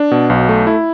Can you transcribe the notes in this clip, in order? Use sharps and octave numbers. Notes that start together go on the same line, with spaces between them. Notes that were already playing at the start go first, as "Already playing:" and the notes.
Already playing: D4
B2
B1
A3
E4